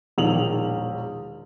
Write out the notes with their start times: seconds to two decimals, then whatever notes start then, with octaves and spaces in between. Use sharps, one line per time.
0.18 E1 A#1 D#3 F7 F#7